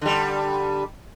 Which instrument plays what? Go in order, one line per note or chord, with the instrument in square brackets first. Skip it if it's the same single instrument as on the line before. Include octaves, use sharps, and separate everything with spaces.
[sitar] D3 G3